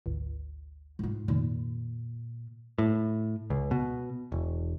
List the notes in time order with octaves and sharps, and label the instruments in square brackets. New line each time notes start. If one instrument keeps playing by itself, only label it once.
[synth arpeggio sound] G#1 D2
[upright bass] G#2 F4
[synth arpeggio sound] F2 D#3 [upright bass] A#2
[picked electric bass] A2
C#2
B2
E1